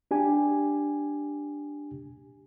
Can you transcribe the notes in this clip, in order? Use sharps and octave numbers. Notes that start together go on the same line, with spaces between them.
D4 G4 G#5